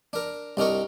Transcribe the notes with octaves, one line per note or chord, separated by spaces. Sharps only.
D4 A#4
C2 D4 D#4 A#4 C#6